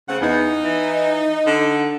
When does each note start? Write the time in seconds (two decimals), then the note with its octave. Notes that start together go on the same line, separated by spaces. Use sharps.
0.09 C#3 A3 C4 F#5
0.21 E2 D#4
0.64 E3
1.46 D3